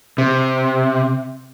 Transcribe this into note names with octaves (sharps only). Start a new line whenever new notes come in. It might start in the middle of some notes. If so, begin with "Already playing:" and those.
C3